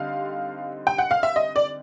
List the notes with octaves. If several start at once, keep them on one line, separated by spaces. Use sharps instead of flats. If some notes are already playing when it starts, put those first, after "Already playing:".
Already playing: D3 G3 C4 D#4 F5
G5
F#5
F5
E5
D#5
D5